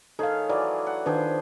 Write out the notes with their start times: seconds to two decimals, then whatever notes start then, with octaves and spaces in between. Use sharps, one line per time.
0.19 D#3 G#4 A4 C#5 F5
0.49 E3 F#3 D5
0.87 F#5
1.06 D#3 F3 D4 G#4 B4 G5